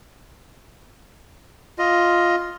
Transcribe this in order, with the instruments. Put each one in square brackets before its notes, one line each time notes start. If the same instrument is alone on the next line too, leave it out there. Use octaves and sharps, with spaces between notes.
[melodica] F4 D#5